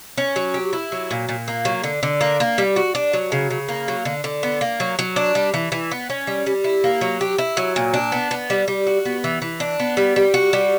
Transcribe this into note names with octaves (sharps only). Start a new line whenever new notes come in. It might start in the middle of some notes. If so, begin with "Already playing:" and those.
C#4
F#3
G4
E4
F#3
A#2
A#2
A#3
F#3
D3
D3
A#3
A#3
G3
F#4
D4
F#3
C#3
C#3
A#3
F#3
D3
D3
B3
A#3
F#3
F#3
D4
G3
E3
E3
B3
C#4
G3
G3
E4
A#3
F#3
G4
E4
F#3
A#2
D4
B3
B3
G3
G3
F#4
B3
E3
E3
D4
B3
G3
G3
F#4
G3